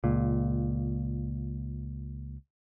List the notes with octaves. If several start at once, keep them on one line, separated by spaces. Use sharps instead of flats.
C#2 A#2